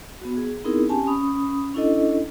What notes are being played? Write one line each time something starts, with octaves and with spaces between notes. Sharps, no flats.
B3 F#4
G#4
B3 C4 D#4 E4 G#4 A#4
C4 C#4 G4 G#5 A5
C#4 B5 D#6
C#4 D4 E4 A4 D#5